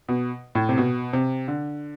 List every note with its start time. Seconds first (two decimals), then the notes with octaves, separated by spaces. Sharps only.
0.08 B2
0.55 A2
0.69 C3
0.78 B2
1.13 C3
1.48 D3